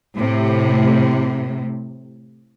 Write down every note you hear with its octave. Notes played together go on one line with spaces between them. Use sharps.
A2 C3